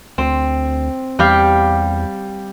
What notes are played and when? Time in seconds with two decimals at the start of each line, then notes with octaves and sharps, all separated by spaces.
0.18 D2 C4
1.19 E2 G3 G4 F5